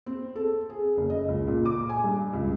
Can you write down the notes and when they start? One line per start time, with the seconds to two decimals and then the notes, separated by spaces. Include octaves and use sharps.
0.06 C4
0.36 A4
0.70 G#4
0.97 F#1
1.10 D#5
1.28 C#2
1.47 A#2
1.65 D6
1.89 G#5
2.04 G2
2.33 C#2